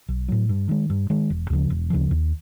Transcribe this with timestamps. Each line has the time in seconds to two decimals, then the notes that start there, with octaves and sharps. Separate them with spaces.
0.09 B1
0.28 A2 F#3
0.49 G2
0.69 D#3 G#3
0.90 G2
1.10 D#3 G#3
1.30 E1
1.50 D2 C#3 F3
1.70 E1
1.90 D2 C#3 F3
2.11 D#2